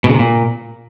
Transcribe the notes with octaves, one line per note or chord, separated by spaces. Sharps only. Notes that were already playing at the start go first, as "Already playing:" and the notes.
B2
C#3
C3
A#2